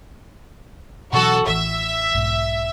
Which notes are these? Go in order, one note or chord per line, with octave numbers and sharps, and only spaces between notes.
B2 E3 F#3 F#4 A4
A1 E3 E5
B1 G#2